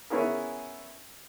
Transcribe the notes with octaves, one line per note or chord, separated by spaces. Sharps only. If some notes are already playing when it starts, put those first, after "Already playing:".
B3 C#4 E4 G#4 A#4